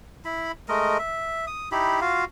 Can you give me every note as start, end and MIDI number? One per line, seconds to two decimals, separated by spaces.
0.25 0.52 64
0.25 0.52 83
0.69 0.98 56
0.69 0.98 57
0.69 0.98 70
0.69 0.98 75
0.99 1.45 76
1.47 1.69 87
1.72 2.00 63
1.72 2.00 64
1.72 2.00 67
1.72 2.00 83
2.01 2.25 65
2.01 2.25 66
2.01 2.25 77